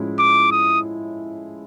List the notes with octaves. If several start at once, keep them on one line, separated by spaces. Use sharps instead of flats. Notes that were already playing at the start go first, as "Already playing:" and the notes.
Already playing: A2 F3 G#3 C#4 E4
D6
D#6